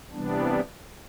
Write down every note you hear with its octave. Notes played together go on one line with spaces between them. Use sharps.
C3 E3 G3 B3 D4